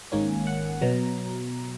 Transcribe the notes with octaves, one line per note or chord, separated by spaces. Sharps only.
G#1 G#2 D#3 A#3 C#4 G#5
F#5
B2 F#3 A#5